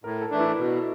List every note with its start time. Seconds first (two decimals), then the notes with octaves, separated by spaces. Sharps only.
0.04 A2 A#4
0.22 A4
0.31 E3 A3 D4
0.40 E4
0.57 B2